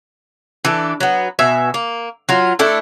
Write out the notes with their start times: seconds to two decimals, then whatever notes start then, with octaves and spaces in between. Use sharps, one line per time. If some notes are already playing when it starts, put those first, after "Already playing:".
0.65 E3 D4 A4
1.01 F#3 B3
1.39 B2 E5 G#5
1.74 A#3
2.29 F#3 F4
2.59 A3 D4 E4 A4